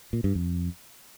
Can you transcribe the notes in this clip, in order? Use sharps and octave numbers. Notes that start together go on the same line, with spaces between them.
A#2
G2
F2